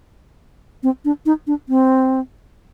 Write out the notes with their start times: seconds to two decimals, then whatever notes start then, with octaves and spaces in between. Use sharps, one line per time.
0.83 C4
1.05 D4
1.26 D#4
1.47 D4
1.69 C4